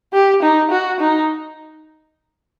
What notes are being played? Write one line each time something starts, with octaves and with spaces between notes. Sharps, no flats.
G4
D#4
F#4
D#4